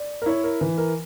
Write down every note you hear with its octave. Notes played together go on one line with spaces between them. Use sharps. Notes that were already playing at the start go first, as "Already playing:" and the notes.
Already playing: D5
A#4
E4 C#5
A#4
E3
A#4